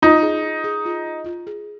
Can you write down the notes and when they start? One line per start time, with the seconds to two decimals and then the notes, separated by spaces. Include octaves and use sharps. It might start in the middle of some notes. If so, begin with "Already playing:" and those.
0.02 D#4 F4
0.22 G#4
0.43 F4
0.64 G#4
0.85 F4
1.06 F4
1.26 F4
1.47 G#4